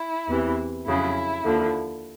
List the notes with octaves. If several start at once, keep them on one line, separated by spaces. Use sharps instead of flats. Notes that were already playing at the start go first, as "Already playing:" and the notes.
Already playing: E4
E2 C3 E3
F2 C#3 F#3 E4
D#2 D3 F3